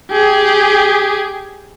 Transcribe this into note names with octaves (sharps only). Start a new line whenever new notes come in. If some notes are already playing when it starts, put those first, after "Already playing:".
G4 G#4